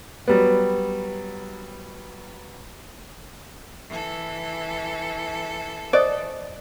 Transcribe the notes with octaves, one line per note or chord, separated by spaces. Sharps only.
F#3 G3 B3
E3 A4
C5 D5 D#5 D#6